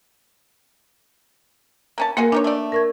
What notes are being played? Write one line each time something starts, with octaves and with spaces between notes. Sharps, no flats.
A#3 C#4 A5
A#3 F4 F#4 G#4 A#4
E3 D4 D#4 C#5
A3 D5
A#4 C#6 G#6